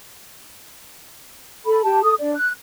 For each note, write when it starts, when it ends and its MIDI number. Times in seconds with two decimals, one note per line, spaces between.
1.66 1.81 69
1.66 1.81 83
1.84 2.02 67
1.84 2.02 81
2.02 2.14 69
2.02 2.14 87
2.20 2.35 62
2.20 2.35 74
2.35 2.51 90